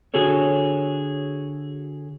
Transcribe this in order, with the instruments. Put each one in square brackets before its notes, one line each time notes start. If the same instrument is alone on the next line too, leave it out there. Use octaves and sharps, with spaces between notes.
[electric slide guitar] D3 F#4 G#4 A4 C#5